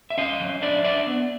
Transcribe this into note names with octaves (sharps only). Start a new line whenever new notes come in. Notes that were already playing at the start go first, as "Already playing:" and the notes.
E5
C#4 D#5 F5
F#3
D4 D5 E5
D4 D5 E5
B3